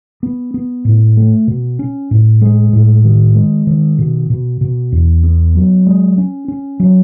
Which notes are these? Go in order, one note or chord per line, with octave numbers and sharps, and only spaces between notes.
B3
B3
A2
A3
B2
C#4
A2
G#3
A2
D#3
G#3
D#3
B2
B2
B2
E2
B3
F#3
G#3
C#4
C#4
F#3